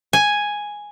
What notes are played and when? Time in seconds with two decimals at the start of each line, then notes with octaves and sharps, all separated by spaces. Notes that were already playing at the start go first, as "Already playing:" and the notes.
0.13 G#5